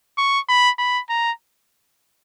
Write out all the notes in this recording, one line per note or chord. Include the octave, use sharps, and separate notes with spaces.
C#6
B5
B5
A#5